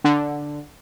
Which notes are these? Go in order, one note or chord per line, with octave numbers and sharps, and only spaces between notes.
D3